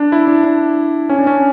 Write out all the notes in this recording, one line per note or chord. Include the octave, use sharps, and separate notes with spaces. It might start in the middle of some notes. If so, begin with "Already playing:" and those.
Already playing: D4
E4
D4
D4
C#4
D4
C#4